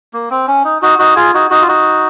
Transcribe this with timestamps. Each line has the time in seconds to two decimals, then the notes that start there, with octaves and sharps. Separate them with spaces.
0.14 A#3
0.31 C4
0.48 C#4
0.64 D#4
0.82 D#4 F#4
0.99 D#4 F#4
1.16 F4 G#4
1.34 D#4 F#4
1.50 D#4 F#4
1.62 F4
1.68 D#4 F#4